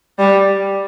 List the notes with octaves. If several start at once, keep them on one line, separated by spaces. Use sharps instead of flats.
G3